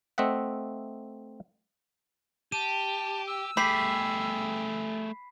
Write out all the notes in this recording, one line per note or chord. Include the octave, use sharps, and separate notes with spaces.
A3 C4 D#5 E5 F#5
G4 A5 D#7
E6
A3 G4 G#4 B5 B6 C7